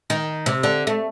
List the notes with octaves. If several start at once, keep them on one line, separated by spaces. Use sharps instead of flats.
D#3
C3
D3
A3